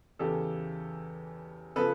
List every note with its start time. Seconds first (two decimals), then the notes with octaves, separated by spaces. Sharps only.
0.19 E2 C#3 E3 G4 A4
1.76 C#3 F3 A4 B4